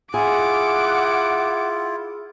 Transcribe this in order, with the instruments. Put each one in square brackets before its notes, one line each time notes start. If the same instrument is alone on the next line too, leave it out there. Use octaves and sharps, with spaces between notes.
[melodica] E4 F4 [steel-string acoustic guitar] G#4 [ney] F#5 [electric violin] D6